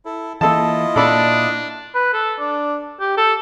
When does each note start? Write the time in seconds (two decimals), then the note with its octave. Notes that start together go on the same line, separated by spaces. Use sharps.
0.05 E4 A4
0.41 E3 A#3 E4 F4 A4 D#5 A5
0.96 A#2 A#3 D4 A4 D5 B5
1.94 B4
2.13 A4
2.39 D4
3.00 G4
3.17 A4